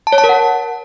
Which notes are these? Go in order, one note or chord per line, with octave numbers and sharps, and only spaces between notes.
A5
C#5
A5
A#4
F#5